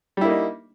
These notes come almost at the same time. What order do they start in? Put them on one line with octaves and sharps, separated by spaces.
G3 E4 A#3 D#4